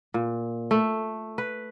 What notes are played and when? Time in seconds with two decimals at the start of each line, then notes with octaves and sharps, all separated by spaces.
0.14 A#2
0.71 A3
1.38 B4